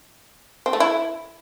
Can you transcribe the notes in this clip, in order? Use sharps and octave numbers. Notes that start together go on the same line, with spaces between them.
C4
A3
E4